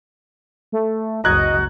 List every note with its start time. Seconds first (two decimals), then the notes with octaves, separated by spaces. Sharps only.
0.72 A3
1.24 F#1 C#2 F#4 D#5 A#5 F#6 G#6